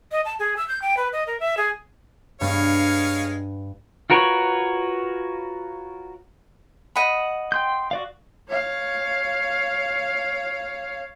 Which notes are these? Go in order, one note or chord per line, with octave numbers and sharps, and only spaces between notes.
D#5
A5
G#4
E6
G6
G5
B4
D#5
A#4
E5
G#4
G2 G#3 B3 C#5 F5
F4 F#4 A#4 B4 C#5
D#5 F#5 B5
G5 C6 G6
F#4 D5 F5
C#5 F5